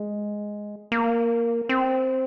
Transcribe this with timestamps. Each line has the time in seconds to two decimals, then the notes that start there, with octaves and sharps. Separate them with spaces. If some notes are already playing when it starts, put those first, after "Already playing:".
Already playing: G#3
0.92 A#3
1.69 C4